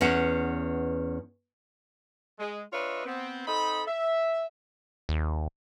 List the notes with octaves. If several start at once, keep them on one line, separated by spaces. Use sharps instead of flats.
E2 B3 C#4 F#5
G#3
D4 F4 B4 C#5 D#5 E5
B3 C4
C4 D#4 A4 D#5 B5
E5
D#2